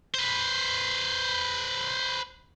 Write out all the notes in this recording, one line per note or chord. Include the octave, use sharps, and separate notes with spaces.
B4 C5